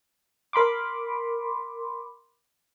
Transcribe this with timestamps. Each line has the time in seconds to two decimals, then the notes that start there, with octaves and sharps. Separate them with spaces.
0.53 A#4 B5 C6 D6